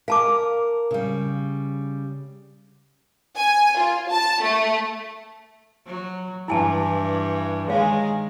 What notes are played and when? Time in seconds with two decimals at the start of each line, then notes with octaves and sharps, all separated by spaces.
0.08 A#4 F5 A5 D6
0.91 C#3 G3
3.37 G#5
3.77 F4
4.08 A5
4.41 A3
5.86 F#3
6.48 G2 E3 E4 G#5 A5
7.68 D#3 G#3 G#4 C#5 F5